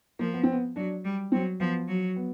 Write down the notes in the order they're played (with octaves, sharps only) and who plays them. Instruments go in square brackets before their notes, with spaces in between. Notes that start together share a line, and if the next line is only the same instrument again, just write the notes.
[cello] F3 [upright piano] A#3
[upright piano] B3
C4
B3
[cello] F#3 [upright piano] D4
[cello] G3
[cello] F#3 [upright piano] C4
[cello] F3 [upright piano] B3
[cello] F#3
[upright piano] B3